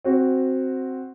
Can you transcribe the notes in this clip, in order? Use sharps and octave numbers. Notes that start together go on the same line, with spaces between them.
C4 F#4